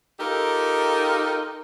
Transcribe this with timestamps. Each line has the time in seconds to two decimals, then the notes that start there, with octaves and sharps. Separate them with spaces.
0.19 D#4 F4 G4 A4 A#4